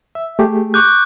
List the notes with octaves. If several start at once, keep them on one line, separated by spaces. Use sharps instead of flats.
E5
A3 G4 G#4
C#6 D6 F#6 G6